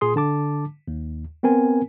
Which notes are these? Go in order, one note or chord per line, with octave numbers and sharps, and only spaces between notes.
A#2 G#4 C6 D#6
D3 A5 D6
D#2
B3 C4 A#4 G#5